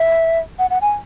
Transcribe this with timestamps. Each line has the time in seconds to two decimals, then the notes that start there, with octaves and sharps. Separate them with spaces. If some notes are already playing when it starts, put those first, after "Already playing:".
Already playing: E5
0.59 F#5
0.70 F#5
0.82 G#5